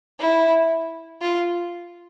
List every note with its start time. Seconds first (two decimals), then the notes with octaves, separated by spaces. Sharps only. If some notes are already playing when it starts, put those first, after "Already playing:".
0.19 E4
1.22 F4